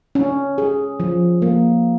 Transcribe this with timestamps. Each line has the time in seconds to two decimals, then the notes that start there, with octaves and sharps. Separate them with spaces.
0.15 C#4
0.58 G#4
1.00 F3
1.42 A#3